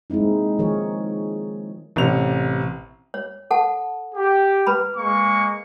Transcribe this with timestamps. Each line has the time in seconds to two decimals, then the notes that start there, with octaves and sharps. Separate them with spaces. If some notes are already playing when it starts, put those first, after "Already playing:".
0.10 G#3 A#3 C4 D#4 E4
0.59 D#3 F3 G#3 G#4 A#4 C#5
1.96 A1 C3 F7
3.14 C#5
3.51 A4 F#5 A5
4.15 G4
4.67 B4 A#5 B5
4.96 G#3 A#3 C#6